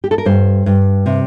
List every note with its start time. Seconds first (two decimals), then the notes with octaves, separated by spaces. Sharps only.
0.04 G4
0.11 A4
0.18 A#4
0.25 G2 C5
0.66 G2
1.06 C3